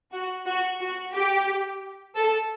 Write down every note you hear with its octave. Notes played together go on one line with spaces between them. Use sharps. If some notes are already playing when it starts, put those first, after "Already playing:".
F#4
F#4
F#4
G4
A4